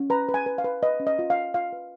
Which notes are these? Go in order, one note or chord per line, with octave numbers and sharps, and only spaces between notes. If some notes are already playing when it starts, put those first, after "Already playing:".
Already playing: C#4
B4 A#5
B4
G#5
B4
F5
B4
B4 D#5
C#4
D#5
F4
F5
F4
F4 F5
B4